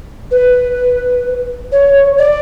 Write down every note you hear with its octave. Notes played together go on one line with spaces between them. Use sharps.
B4
C#5
D5